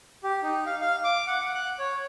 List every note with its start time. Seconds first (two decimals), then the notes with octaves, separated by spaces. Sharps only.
0.24 G4
0.43 D#4
0.66 F5
0.81 F5
1.04 D6
1.27 F#5
1.41 F#5
1.55 F#6
1.79 C#5